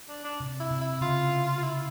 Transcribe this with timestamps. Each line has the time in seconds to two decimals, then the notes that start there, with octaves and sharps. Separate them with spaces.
0.09 D4
0.24 D4
0.40 C3
0.60 E4
0.71 C3
0.81 E4
1.01 C#3 F4
1.58 F4
1.63 E4